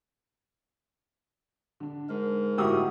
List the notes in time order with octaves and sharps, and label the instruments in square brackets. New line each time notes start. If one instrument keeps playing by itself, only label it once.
[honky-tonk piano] D3 D4
[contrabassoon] G#2 [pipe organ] G#3 A#4
[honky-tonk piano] G1 A2 D#6 [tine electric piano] E4 F#4 G4